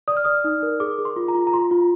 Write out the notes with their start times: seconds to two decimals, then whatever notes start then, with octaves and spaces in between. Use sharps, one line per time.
0.08 D5 D#6
0.17 F6
0.24 D5 D#6
0.44 D#4
0.63 A#4
0.80 G#4 D6
0.99 G#4
1.05 C6
1.16 F4
1.28 A#5
1.35 F4
1.47 A#5
1.54 F4 C6
1.71 F4